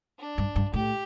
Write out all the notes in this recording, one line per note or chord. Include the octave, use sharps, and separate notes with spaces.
D4
G2
G2
A2 G4